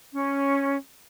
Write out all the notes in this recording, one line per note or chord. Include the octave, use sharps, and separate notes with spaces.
C#4